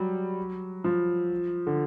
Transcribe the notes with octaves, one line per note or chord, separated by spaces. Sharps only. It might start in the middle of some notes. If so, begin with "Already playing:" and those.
Already playing: F#3 G3
F3
D3